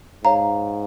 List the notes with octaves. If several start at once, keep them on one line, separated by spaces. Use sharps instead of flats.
G#2 C#5 F5 A#5